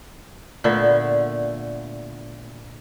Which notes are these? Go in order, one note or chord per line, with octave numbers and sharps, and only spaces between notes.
A#2 D3 A3 B3